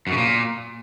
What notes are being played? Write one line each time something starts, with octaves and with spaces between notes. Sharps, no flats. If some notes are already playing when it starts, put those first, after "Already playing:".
F#2
C#3
A#2